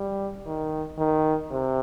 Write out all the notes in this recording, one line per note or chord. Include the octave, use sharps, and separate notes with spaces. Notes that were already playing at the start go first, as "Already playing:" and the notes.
Already playing: G3
D#3
D#3
C3